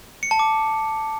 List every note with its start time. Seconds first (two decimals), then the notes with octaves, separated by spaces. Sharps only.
0.23 C#7
0.31 A5
0.39 D6